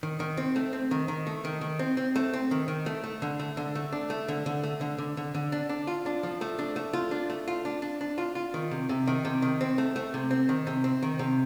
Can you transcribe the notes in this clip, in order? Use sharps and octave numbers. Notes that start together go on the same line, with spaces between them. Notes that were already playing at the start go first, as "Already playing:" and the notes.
D#3
D#3
C4
A3
C4
D#3
D#3
A3
D#3
D#3
C4
C4
A3
C4
D#3
D#3
A3
A3
D3
A3
D3
A3
D4
A3
D3
D3
A3
D3
D3
D3
D3
D4
D4
F4
D4
F3
A3
D4
A3
F4
D4
A3
F4
D4
D4
D4
F4
F4
D#3
C3
C3
D#3
C3
D#3
C4
A3
A3
C3
C4
D#3
C3
C4
D#3
C3